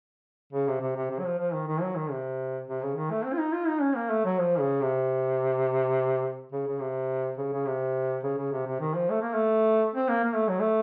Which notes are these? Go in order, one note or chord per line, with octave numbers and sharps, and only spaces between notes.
C#3
C3
C3
C3
C3
F#3
F3
F3
D#3
D#3
F#3
D#3
C3
C3
C#3
D#3
A3
C4
F4
D#4
F4
D#4
C#4
A#3
A3
F#3
F3
C#3
C3
C#3
C#3
C3
C#3
C#3
C3
C#3
C#3
C3
C3
D#3
F3
A3
A#3
A3
C4
A#3
A#3
A3
F#3
A3